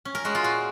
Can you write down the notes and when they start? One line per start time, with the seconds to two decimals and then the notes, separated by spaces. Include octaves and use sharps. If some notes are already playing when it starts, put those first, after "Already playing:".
0.05 C#4
0.15 A#4
0.25 G#3 F#4
0.35 F4
0.44 A#2 F#4